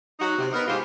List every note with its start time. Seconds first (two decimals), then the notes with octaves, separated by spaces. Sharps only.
0.20 F#3 D#4 F#4
0.38 C3
0.53 B3 D#4 A#4
0.68 G#2 G#3 F4 G4 G#4 C5